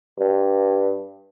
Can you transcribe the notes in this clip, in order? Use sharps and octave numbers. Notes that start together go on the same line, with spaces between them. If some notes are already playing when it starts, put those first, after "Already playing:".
G2